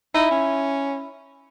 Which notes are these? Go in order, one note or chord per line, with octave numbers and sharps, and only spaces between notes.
D#4 E4
C#4